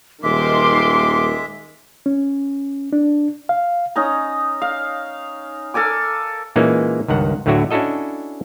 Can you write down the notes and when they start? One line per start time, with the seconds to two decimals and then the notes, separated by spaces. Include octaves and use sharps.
0.23 D#1 D#3 G#3 E5 C6 D6
2.06 C#4
2.93 D4
3.49 F5
3.96 C#4 D#4 A#5
4.62 F5
5.74 A4 A#4 G#5 D6
6.56 A#2 E3 G#3 A#3 C#4 D#4
7.08 C#2 G2 D#3 F#5
7.46 D2 A2 D3 F#3 E4 F#4
7.71 C#4 D4 E4 F#4 A4 D#5